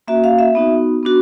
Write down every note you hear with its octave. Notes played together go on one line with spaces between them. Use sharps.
A#3 C#4 F#4 E5
F5
E5
B3 D#4 F#4
B3 D4 F#4